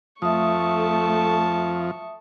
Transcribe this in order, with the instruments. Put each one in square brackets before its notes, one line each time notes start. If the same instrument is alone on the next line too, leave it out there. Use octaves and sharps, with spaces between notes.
[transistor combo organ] F2 F3 [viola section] A3 [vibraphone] E5 D#6 [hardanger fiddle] A5 C#6